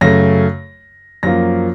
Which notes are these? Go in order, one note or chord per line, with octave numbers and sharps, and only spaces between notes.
F#2 C#3 A3 A#6
F#2 F3 A#3 A#6